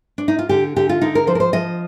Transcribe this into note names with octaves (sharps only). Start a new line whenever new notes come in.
D4
D#4
F4
D3 G4
D3 G4
F4
D3 D#4
A#4
F3 C5
A#4
C5
F3 D#5